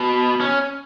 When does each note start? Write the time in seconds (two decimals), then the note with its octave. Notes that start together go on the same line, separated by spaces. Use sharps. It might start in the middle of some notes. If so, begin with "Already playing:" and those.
Already playing: B2
0.41 C#4